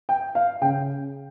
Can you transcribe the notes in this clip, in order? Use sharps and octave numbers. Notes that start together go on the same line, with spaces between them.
G5
F5
C#3 G5